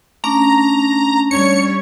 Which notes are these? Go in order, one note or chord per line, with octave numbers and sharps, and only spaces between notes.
A3 C#4 D4 A#5
G3 C#5 C#7